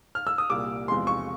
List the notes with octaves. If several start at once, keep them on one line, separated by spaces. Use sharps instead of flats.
F6
E6
D#6
C2 A#2 G3 D6
E2 C3 F3 G#3 C6
C#6